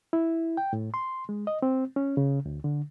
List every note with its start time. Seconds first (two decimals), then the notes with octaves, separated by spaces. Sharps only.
0.13 E4
0.57 G5
0.73 A2
0.94 C6
1.29 G#3
1.47 D#5
1.62 C4
1.96 C#4
2.17 C#3
2.46 D2
2.64 D3